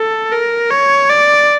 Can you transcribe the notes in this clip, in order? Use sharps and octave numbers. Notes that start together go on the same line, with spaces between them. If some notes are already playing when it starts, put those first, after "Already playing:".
Already playing: A4
A#4
C#5
D5